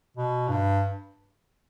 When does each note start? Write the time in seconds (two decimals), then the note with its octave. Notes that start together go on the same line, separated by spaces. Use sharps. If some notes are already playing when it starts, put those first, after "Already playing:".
0.17 B2
0.48 G2